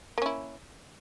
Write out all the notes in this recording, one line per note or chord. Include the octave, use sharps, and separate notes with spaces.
A#3 C#4 E4